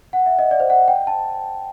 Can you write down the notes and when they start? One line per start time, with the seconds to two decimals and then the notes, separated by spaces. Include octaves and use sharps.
0.13 F#5
0.26 E5
0.39 D#5
0.51 D5
0.60 C5
0.70 F#5
0.88 G5
1.07 A5